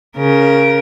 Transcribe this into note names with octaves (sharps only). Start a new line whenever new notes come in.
C#3 A#4